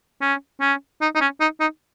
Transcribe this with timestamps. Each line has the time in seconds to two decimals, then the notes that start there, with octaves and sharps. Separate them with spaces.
0.22 C#4
0.61 C#4
1.02 D#4
1.15 D#4
1.21 C#4
1.41 D#4
1.61 D#4